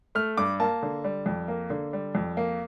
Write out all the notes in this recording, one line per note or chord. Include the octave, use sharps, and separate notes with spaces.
A3 F6
G2 D6
A#3 A5
D3
G3
F2
A#3
D3
G3
F2
A#3